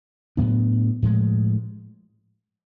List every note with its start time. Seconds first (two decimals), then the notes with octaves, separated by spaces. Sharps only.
0.37 A2 F#3 B3 D4
1.02 A2 F3 G#3